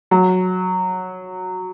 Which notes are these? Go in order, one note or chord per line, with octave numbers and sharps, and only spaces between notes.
F#3